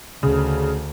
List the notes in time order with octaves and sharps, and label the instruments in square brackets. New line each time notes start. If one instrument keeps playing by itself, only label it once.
[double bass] D2 [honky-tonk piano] C#3